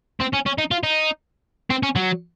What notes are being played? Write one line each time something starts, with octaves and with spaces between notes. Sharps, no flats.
C4
C#4
C#4
D#4
F4
D#4
C4
C#4
F#3